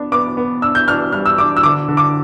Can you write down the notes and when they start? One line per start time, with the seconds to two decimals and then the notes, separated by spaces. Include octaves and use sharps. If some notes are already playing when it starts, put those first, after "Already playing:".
Already playing: B3 D4
0.12 B3 D6
0.37 B3
0.62 D4 E6
0.75 G6
0.88 D4 F6
1.12 G3 F6
1.26 E6
1.38 D4 D6
1.57 E6
1.63 D3 D6
1.88 D3
1.97 D6